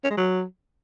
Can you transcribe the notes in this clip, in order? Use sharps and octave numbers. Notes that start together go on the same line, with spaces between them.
C#4
G#3
F#3